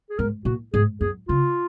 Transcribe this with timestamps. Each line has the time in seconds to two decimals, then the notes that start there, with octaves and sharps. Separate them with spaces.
0.10 G#4
0.18 G#2 A#4
0.45 A#2 F#4
0.73 G#2 G#4
1.01 F#2 G#4
1.28 C#3 F4